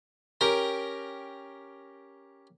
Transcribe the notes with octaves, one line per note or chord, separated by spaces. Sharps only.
C#4 G4 A#4 G5 A#5